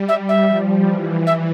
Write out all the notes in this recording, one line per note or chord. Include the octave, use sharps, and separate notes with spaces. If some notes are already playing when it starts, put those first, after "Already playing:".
Already playing: G3
E5
E5
F3
E3
E5